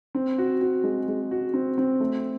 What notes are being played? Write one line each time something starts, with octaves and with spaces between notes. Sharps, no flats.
C4
F#4
F#4
G#3
G#3
F#4
C4
C4
A3